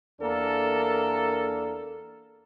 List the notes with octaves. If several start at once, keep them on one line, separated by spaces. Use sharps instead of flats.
E2 A#3 D4 A4 A#4